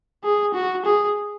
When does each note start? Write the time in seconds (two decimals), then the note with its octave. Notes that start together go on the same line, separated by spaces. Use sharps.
0.24 G#4
0.54 F#4
0.85 G#4